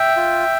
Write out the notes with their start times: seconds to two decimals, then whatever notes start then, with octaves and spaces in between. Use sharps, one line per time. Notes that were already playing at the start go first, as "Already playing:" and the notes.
Already playing: E5 G5
0.16 F4